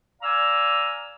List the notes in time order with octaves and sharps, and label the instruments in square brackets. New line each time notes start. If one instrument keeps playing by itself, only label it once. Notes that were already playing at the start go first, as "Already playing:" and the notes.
[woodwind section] D5 F5 G#5 A#5 D6 E6